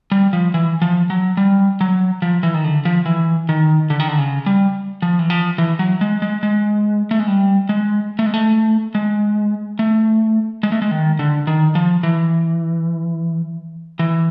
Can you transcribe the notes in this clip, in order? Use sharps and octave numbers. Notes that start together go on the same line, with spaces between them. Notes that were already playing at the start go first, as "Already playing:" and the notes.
G3
F3
E3
F3
F#3
G3
F#3
F3
E3
D#3
D3
F3
E3
D#3
D3
D#3
D3
C#3
G3
F3
E3
F3
E3
F#3
G#3
G#3
G#3
A3
G#3
G3
G#3
A3
G#3
A3
G#3
A3
G#3
A3
G#3
D#3
D3
D#3
F3
E3
E3